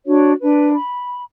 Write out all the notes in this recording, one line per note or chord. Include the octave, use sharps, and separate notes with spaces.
D4 F#4 C#5
D4 B4
B5